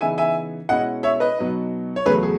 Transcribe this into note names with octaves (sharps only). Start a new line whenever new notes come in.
C#3 E3 B3 D#4 E5 G#5
E5 G#5
B2 G#3 C#4 E4 D#5 F#5
C#5 E5
B4 D#5
B2 F#3 B3 D#4
C#5
E2 C#3 F#3 A3 G#4 B4
G#4